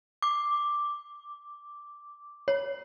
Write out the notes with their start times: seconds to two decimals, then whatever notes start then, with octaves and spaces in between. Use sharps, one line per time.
0.22 D6
2.48 C#5